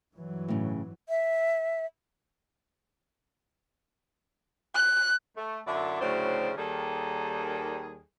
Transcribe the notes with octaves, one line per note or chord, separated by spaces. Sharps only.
G2 E3 F#3
A2 C#3
E5
F#6
A3
F#2 D3 E4 D5 E5
D2 A2 C#3 F#3 D4 C5
D#2 D#3 G3 A#3 G#4 A4